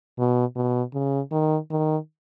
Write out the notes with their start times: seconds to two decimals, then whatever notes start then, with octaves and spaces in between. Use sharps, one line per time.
0.18 B2
0.56 B2
0.94 C#3
1.31 D#3
1.70 D#3